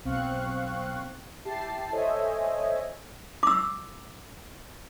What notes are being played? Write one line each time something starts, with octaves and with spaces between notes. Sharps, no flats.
B1 B2 C4 F5 C#6 F#6
E4 G4 A5 A6 C7
A4 C5 C#5 D#5 E5 G#5
D6 E6